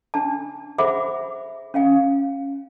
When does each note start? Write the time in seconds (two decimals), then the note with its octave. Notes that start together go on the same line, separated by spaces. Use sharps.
0.14 D4 A5
0.78 G#4 C5 E5 F#5 B5 D6
1.74 C#4 F5 G5